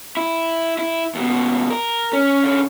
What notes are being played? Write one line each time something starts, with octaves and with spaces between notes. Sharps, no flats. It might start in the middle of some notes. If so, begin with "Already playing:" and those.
E4
E4
D#2 B2
A#4
C#4
D3 C#4